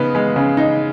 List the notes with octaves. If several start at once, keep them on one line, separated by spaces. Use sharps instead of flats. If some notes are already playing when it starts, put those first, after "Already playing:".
Already playing: C#3 B3 D#4
G#3
C#3
D#4